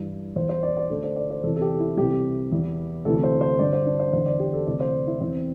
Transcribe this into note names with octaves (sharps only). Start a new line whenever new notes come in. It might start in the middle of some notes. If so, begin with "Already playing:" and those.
Already playing: G2 E3
E2 E3 C5
C5
D5
D5
D2 D3 A4
C5
D5
C5
E2 C3 E3 A4
A4
G4
E4
C2 C3 E3 G4
E2 E3
D2 C3 E3 A4
C5
C5
G2 D3 D5
C5
D4
C5
E2 D3 C5
D5
G4
A4
D2 C3 E3 D5
C5
E4
E2 E3 C4